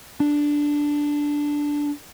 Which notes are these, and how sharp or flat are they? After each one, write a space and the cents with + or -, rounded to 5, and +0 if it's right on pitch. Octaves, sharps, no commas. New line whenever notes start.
D4 -5